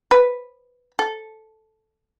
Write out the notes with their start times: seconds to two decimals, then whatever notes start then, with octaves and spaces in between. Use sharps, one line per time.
0.11 B4
0.99 A4